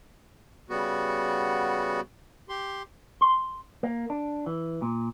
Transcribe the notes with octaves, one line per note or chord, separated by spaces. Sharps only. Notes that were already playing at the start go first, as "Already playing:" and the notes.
C#3 G3 B3 F#4
G4 C6
C6
A#3
D4
E3
A#2